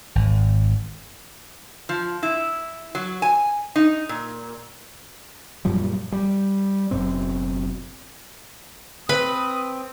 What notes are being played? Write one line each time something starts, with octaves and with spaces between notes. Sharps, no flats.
G#1
F3
E4
F#3
G#5
D#4
A#2
F#2 A#2 F3 G3
G3
F#1 F#2 B2 C4
C4 B4 B5 D#6